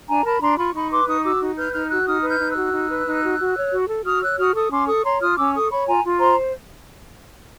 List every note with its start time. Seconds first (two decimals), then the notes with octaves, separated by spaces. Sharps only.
0.08 D4 G#5 A#5
0.25 A#4 A5 B5
0.41 D4 A#5 C6
0.58 F4 B5 C#6
0.75 D#4 B5 C#6
0.91 B4 C6 D6
1.07 D#4 C#6 D#6
1.24 F#4 D6 E6
1.40 D#4
1.57 B4 F6 G6
1.74 D#4 F6 G6
1.90 F#4 E6 F#6
2.06 D#4 D#6 F6
2.23 B4
2.29 F6 G6
2.40 D#4
2.50 E6 F#6
2.56 F#4
2.73 D#4
2.89 B4
3.06 D#4
3.22 F#4
3.39 F#4
3.56 C#5
3.72 F#4
3.89 A4
4.05 F#4 D#6 F6
4.21 C#5 E6 F#6
4.38 F#4 D#6 F6
4.54 A4 C#6 D#6
4.71 C#4 C6 D6
4.87 A4 C#6 D#6
5.04 C#5 A#5 C6
5.21 F4 D#6 F6
5.37 C#4 D6 E6
5.53 A4 C#6 D#6
5.70 C#5 B5 C#6
5.86 F4 G#5 A#5
6.04 F4
6.19 C5 A#5 C6